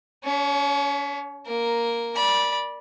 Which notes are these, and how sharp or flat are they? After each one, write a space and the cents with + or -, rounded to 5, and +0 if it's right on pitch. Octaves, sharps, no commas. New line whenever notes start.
C#4 +40 C#5 +0
A#3 +0 A#4 +0
D5 +0 B5 -25